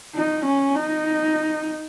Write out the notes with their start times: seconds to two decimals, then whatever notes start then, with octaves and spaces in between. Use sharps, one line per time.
0.15 D#4
0.45 C#4
0.76 D#4